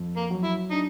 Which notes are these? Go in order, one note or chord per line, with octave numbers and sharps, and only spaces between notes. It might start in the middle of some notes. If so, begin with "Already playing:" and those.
Already playing: F2
A#3
F#3
E4
D4 D#4